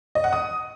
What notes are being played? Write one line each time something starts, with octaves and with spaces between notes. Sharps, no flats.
D#5
F#5
D#6